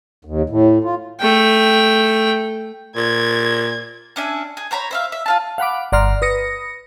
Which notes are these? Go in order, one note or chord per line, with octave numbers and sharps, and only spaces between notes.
D#2
A2
F4
A3 G5
A#2 G#6
C#4 D4 E5 G#5
G#4
C5 C#5 A#5 B5
C5 E5 F5
E5
F4 F5 A5
F5 F#5 B5 D6
G1 D5 F#5 A#5 C6 F6
B4 D#6 A#6 C#7